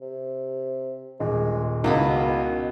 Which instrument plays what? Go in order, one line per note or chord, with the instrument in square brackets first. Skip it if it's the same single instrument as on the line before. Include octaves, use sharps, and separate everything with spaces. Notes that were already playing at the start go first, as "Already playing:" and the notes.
[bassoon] C3
[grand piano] D#1 [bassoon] G#3
[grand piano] C#2 [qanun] B2 E4 B5 [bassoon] D#3